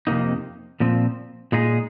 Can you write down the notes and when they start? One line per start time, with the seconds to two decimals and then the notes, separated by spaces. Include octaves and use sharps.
0.07 F2 C3 F3 A#3 D#4
0.80 A#2 F3 C4
1.52 A#2 G#3 D#4 G#4